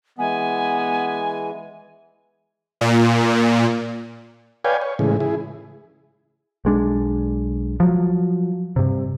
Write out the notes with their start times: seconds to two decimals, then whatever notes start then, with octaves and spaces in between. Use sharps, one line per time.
0.19 E3 G#3 B3 G#5
2.81 A#2
4.65 B4 C#5 D5 F5 G5 G#5
4.81 C#5
4.99 A2 C#3 E3 G#3
5.20 E4 G#4
6.65 B1 G#3 D4
7.80 F3 F#3
8.76 G2 C3